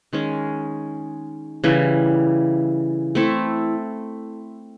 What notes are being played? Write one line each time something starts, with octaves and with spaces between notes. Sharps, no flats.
D#3 G#3 C#4
C#3 E3 G3
A3 C4 E4 A4